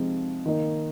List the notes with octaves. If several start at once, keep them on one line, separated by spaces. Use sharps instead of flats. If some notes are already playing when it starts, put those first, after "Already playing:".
Already playing: C3 F3 G#3 C4 D#4
D#3 A#3 D#4